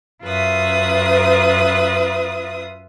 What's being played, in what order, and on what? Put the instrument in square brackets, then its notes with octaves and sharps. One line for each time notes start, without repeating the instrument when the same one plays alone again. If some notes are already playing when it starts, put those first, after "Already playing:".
[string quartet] F#2 F4 B4 E5 D#6